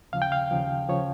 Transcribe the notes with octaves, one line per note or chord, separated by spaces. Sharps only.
D#2 C#3 F3 F5
G5
F5
D#2 C#3 F3
C#3 F3 C#5